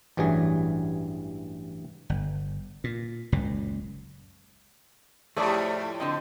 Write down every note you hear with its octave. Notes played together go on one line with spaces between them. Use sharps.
A1 G2 E3 F#3 G#4
G1
A#2
F#1 C#2 A#2
F2 A2 G3 A3 G#4 A4 D5
D3 C4 D#5